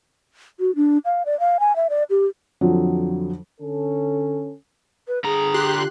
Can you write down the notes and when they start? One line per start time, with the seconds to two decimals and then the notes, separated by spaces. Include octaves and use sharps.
0.60 F#4
0.76 D4
1.05 F5
1.26 D5
1.40 F5
1.60 G#5
1.76 E5
1.90 D5
2.10 G4
2.61 F2 D3 F3 F#3
3.60 D3 C#4 A4
5.07 B4
5.24 D3 G#4 A#5
5.54 G4 C6 F#6
5.77 F4